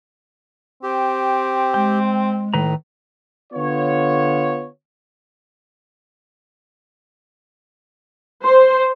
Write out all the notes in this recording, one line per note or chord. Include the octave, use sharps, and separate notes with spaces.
C4 G4
G#3 G5
A2 D#3 B4 A#5
D3 B3 F4 C#5
C5